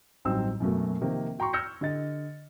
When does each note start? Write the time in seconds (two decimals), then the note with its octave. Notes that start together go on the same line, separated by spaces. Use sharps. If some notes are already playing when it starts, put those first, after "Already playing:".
0.25 A1 G2 F#3 C4 D#4 E6
0.60 F#2 B2 F#3 A3 A#3
1.01 C3 D#3 F3 A#3 C4
1.39 F#4 G5 A#5 C6 C#6
1.53 E6 F6 G6 G#6 A#6 C#7
1.81 D3 G4 D#5 A6